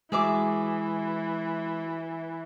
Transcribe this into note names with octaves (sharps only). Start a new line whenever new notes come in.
E3 G#3 F#4 G#4 E5 D6